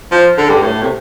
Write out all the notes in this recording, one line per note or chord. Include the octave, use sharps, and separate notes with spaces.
F3
D3
G2
A2
C3